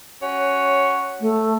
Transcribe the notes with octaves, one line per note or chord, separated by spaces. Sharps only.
C#4 F#4 C#5
A3